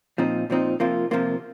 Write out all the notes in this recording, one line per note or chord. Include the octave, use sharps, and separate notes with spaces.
A#2 F3 C4 D#4
A#2 F3 C4 D#4
C3 F3 A#3 F4
C3 F3 A#3 F4